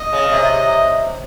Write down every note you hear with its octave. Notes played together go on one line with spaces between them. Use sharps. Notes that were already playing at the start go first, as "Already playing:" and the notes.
Already playing: D#5
C#3
C3